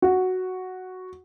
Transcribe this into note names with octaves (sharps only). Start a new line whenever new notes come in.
F#4